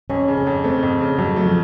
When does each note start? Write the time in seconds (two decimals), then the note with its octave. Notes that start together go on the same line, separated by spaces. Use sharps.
0.10 F2 C#4
0.28 C#3
0.37 C#4
0.47 F2
0.64 A3 C4
0.83 F2
1.00 C#3
1.18 F2 F#3
1.36 A3
1.46 F3